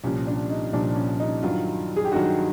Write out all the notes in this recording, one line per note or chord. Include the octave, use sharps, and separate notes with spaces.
C2 A#2 F3 C#4
D4
D#4
C2 A#2 F3 D4
C#4
D#4
G2 D#3 F#3 F4
G#4
G4
G2 D#3 F#3 F#4